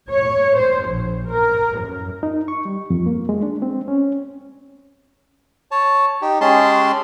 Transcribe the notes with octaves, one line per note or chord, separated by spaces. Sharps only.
C#5
C5
A#1
A#4
F#2
D#4
C#6
G3
F2
A#3
G#3
D4
C4
C#4
C#5 A5
D#4 G4
G#3 C#4 G4 G#4 A5 C6